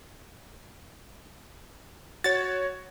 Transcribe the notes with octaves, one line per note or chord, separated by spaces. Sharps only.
F#4 C#5 A6